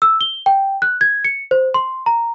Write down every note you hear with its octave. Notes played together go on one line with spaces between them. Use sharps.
E6
G7
G5
F#6
G#6
C#7
C5
C6
A#5